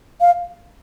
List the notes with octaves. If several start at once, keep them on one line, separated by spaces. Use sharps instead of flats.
F5